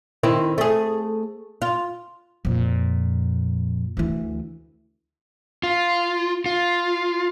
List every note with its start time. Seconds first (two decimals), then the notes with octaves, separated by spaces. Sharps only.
0.23 D#3 C4 E4
0.58 A3 G#4
1.62 F4
2.45 F2 A#2
3.97 D2 E3
5.63 F4
6.46 F4